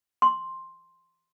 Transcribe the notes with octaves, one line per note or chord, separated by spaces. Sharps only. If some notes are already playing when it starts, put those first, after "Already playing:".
C6